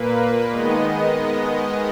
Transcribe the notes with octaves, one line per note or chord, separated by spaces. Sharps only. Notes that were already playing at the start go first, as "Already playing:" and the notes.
Already playing: A#2 A#3 B4
D#3 G#3 B3 D#5